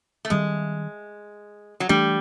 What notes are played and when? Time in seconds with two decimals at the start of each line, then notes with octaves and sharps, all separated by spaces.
0.25 A3
0.30 D#3 G3 G#3 C4
1.80 F#3
1.89 E3 G3 A3 D4